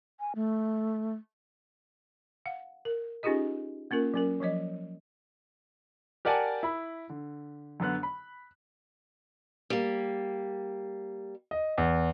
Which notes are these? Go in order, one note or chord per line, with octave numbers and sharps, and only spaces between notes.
G#5
A3
F5 F#5
A#4
C#4 D#4 F4 G4 G#4 D#5
A#3 C#4 F4 A#4
F#3 C#4 A#4
F3 F#3 C#5 D#5
G4 A#4 D5 F#5 G#5 A5
E4 B5
D3
F#2 D3 B3 F#6
B5
G3 A#3
D#5
E2